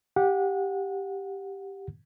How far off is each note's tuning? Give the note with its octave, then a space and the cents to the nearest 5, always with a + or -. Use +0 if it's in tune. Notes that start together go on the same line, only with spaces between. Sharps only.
G4 +0 F#5 -25